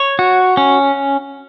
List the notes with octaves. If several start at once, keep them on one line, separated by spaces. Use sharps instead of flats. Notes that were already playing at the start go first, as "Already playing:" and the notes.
Already playing: C#5
F#4
C#4